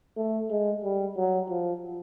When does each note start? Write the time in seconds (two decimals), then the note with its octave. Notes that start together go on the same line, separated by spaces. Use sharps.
0.17 A3
0.51 G#3
0.83 G3
1.17 F#3
1.50 F3